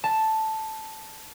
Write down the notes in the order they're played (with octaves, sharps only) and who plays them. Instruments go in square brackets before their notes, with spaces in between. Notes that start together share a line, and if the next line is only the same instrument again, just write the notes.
[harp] A5